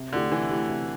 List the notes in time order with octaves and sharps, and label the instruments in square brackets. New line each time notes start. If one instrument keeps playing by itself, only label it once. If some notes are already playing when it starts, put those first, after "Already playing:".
Already playing: [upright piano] C3
[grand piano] D3 [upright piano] A3 E4 G4
[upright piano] C3 [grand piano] E3
[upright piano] A3 E4 G4
C3